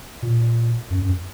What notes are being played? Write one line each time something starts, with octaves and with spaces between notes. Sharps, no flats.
A#2
F#2
F#2